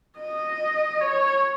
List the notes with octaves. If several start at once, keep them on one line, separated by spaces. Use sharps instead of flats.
D#5
C#5